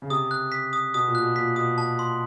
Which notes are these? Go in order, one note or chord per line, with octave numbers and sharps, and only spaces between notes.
C#3
C3 D#6
F#6
B6
D#6
B2 D#6
A#2
F#6
B2
A#2 B6
B2 D#6
A5
C6